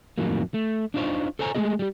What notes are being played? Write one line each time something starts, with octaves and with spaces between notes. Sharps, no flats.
F2 A2 D#3 F#3 A#3
A3
D4 D#4 F4 C5 C#5
A4 C5 C#5 G#5 A#5
G#3 A3 C#4 D4 G#4 D#5
G3 G4